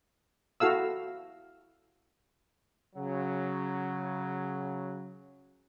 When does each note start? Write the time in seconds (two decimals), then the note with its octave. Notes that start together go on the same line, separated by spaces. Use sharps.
0.60 E4 F#4 A4 F5 E6
2.96 C#3 F#3